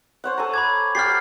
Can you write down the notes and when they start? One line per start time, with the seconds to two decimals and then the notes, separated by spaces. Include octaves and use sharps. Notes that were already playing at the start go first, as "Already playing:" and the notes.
0.24 C5 C#5 F#5
0.38 A4 G#5 A#5
0.54 B5 D6 G#6
0.95 G4 F#5 F6 A6 C7